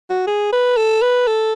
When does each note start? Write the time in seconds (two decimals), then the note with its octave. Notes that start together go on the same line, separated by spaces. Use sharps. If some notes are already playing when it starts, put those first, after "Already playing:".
0.10 F#4
0.27 G#4
0.52 B4
0.77 A4
1.02 B4
1.27 A4